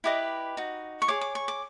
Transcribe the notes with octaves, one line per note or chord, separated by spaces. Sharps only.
E4 G4 B4 D#5 D6
D#4 F#4
C#6
G#4 C#5 D6
D6
C#6
D6